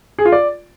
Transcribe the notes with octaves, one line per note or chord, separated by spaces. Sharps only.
G#4
F4
D5